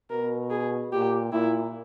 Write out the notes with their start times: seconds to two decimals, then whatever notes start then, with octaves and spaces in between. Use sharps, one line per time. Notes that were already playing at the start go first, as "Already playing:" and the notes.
0.10 B2 A#4
0.51 G#4
0.92 A#2 G4
1.33 A#2 E4